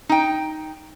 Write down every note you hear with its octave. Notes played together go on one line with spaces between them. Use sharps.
D#4 G5